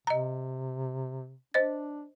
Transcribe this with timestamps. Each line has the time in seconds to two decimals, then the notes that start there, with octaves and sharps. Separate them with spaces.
0.07 C3 D#5 A#5
1.54 D4 C5 D#5 A6